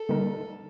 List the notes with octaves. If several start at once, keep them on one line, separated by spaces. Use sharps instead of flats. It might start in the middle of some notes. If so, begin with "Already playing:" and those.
Already playing: A4
D3 G3 A#3 D#4 A#4